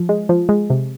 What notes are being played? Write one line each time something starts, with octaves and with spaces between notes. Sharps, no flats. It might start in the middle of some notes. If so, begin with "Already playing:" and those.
Already playing: F3
G#3
F3
G#3
C3